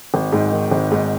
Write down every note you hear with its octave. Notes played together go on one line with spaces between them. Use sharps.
G#1
G#2
D#3
G#1
G#2